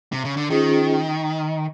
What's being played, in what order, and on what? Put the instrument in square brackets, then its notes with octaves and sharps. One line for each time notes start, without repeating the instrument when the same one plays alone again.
[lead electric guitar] C3
C#3
D3
[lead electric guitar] D#3 [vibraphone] C#4 F4 G#4 C5